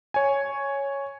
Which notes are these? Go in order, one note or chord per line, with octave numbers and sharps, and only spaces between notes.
C#5 G#5